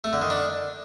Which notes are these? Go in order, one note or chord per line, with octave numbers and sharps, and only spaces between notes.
A3
D3
D#3
D4